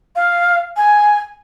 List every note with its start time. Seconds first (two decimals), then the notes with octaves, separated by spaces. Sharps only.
0.15 F5
0.76 G#5